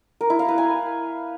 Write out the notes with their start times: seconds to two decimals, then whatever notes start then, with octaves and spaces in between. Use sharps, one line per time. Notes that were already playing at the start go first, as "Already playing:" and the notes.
0.21 A#4
0.30 E4
0.39 F5
0.48 B4
0.58 G#5